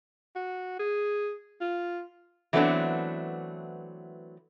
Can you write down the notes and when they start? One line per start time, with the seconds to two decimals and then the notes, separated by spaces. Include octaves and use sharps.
0.36 F#4
0.79 G#4
1.61 F4
2.53 E3 F#3 A3 B3 C4 D4